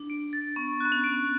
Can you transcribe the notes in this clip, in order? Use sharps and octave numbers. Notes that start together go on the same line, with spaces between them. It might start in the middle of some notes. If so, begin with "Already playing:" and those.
Already playing: D4
D7
A6
B3 C#6
B3 F#6
C#4
D7